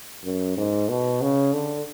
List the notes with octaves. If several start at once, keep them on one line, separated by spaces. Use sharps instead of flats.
F#2
G#2
B2
C#3
D3